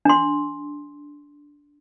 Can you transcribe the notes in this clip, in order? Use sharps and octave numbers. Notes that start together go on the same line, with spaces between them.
D4 C6